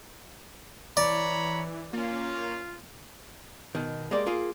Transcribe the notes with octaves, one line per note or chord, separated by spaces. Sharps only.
E3 C#5 D5 A#5 B5
A#3 C#4 F4
B2 D#3
G#3 A#3 G4 D5
A#3 F4 G#4